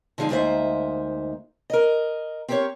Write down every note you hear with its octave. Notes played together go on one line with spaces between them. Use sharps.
D3 F3 G#3 D4 D#4
D2 G#3 A#3 D#4 C5 E5
A#4 D#5
C4 G4 A#4 C5 C#5